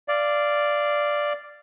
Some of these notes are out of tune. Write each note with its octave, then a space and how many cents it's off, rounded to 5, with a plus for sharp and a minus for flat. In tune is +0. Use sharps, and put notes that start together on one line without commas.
D5 +0 F5 -15